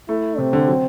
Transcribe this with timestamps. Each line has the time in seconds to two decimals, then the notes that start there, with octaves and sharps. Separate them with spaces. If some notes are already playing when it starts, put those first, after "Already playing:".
0.09 A3 E4
0.38 C3 C4
0.53 D3
0.68 F#3